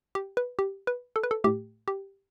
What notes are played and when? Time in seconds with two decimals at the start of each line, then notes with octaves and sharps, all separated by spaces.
0.15 G4
0.37 B4
0.59 G4
0.87 B4
1.16 A4
1.23 B4
1.31 A4
1.44 A2 A3 G4
1.88 G4